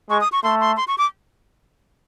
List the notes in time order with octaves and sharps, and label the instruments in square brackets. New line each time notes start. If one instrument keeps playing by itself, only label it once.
[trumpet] G#3 [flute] C#6
[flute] D#6
C#6
[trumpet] A3 [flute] C6
[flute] C6
C6
C#6
D6